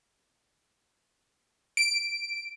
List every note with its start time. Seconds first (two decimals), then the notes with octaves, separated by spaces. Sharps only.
1.77 D7